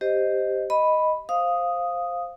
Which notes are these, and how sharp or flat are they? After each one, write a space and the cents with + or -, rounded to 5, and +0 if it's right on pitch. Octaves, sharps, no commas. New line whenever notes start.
G4 +0 C5 +0 D#5 +0
D#5 +0 B5 +0
C5 +0 F5 +0 D#6 +0